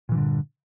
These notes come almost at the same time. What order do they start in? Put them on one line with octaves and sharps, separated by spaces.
A#2 E3 G2 D3